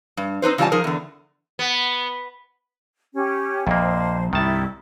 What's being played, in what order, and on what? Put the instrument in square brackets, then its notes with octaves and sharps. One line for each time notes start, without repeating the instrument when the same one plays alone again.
[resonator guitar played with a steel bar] G2
C4 D#4 B4 C5
C#3 E3 G3 F4 G#5 A5
F3 D#4 G#4 A#4
E2 D3
[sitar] B3
[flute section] C#4 G4
[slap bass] A#1 [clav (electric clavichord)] F2 A#3 [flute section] C5
[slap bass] C2 G2 [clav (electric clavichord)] D#3 A5 [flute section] E4